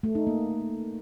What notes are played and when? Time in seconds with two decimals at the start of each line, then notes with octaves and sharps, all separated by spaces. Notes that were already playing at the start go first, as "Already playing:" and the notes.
0.03 A3
0.15 D#4
0.27 A#3